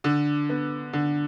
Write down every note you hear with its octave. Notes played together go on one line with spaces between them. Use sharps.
D3
B3
D3